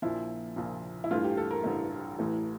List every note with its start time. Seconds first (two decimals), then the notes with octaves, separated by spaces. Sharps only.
0.02 A#1 A#2 F3 E4
0.56 A#1 A#2 F3
1.04 E4
1.11 A1 G2 E3 A3 F4
1.24 G4
1.37 A4
1.51 A#4
1.64 A1 G2 E3 A3
2.18 A1 A2 E3 A3